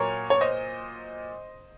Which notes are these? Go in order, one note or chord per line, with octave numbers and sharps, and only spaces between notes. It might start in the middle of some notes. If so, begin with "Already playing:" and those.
Already playing: A#2 F#3 A#4 C#5
C#5
C5 D#5